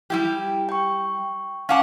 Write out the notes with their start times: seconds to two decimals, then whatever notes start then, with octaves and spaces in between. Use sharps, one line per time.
0.10 G3 E4 G4
0.69 G5 C#6
1.69 C#4 F5 F#5 A5 D6